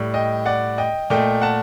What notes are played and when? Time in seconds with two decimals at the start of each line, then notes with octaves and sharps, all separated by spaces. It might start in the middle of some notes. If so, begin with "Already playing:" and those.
Already playing: A2 G3
0.14 D#5 G5
0.46 D5 F#5
0.78 D#5 G5
1.10 A#2 A3 D#5 G5
1.42 F#5 A5